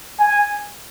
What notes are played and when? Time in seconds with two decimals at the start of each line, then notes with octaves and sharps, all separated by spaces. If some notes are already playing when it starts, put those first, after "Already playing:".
0.19 G#5